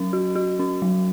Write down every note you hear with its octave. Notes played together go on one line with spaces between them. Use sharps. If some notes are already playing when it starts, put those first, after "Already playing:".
Already playing: F#3 C#4
F#4
F#4
C#4
F#3